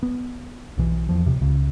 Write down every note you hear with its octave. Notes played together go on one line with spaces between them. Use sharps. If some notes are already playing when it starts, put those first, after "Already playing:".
B3
B1 B2 E3
E2 F3
D#1 C3
C#2 C#3